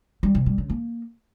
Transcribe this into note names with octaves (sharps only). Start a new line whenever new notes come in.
G3
C3
G3
C#3
A#3